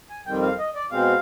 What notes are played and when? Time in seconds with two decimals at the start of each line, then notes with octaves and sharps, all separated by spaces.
0.10 G#5
0.26 F2 D#3 G3 C4 G5
0.42 F5
0.59 D#5
0.75 D5
0.91 B2 G#3 C4 F5